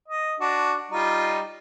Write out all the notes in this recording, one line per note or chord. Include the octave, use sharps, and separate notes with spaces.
D#5
D4 F#4
G3 D#4 F4